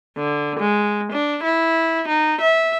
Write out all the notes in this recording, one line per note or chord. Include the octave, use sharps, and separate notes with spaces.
D3
G#3
D4
E4
D#4
E5